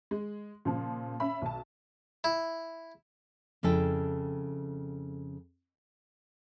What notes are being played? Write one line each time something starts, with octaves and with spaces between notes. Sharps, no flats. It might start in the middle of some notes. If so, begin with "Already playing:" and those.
G#3
A#2 C#3 F3
C#4 E5 B5
B1 A5
E4
F2 C#3 E4 A4 G5